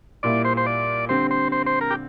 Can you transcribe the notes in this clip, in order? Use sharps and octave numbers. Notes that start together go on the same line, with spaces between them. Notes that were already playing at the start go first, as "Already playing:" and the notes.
A#2 G3 A#3 E4 D5
C5
C5
D5
D3 G3 C4 C5
C5
C5
C5
A#4
G4